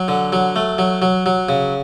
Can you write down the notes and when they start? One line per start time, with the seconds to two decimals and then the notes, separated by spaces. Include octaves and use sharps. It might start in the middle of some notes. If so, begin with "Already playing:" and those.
Already playing: F#3
0.08 D3
0.33 F#3
0.56 A3
0.78 F#3
1.02 F#3
1.26 F#3
1.49 C#3